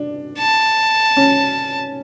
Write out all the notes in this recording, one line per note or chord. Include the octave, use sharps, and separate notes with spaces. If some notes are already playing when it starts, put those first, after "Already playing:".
Already playing: D4
A5
C#4